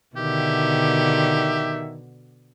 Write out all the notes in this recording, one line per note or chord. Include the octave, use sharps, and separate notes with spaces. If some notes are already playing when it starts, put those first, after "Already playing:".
B2 D3 D#3 G4 E5